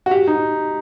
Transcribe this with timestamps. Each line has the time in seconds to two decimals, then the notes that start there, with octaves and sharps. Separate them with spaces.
0.06 F#4
0.11 G4
0.27 D#4